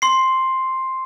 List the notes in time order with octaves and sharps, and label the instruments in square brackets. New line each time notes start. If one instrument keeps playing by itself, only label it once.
[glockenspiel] C6 C7